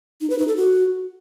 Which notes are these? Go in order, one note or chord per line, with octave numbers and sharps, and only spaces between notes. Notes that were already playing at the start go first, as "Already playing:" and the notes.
D#4
B4
D#4
A4
F#4